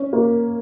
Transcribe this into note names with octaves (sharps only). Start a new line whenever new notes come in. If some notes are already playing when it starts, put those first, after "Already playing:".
Already playing: C#4
A#3